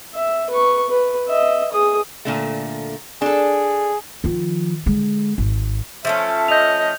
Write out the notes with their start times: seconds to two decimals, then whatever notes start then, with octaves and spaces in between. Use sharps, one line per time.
0.15 E5
0.50 B4 C#6
0.89 B4
1.28 D#5 E5
1.72 G#4 D#6
2.25 A#2 D3 A3
3.22 D4 G#4 A4
4.24 D#3 F3
4.86 D3 G#3
5.38 G#1
6.05 F3 A3 C#4 E5
6.48 D#5 G6 F7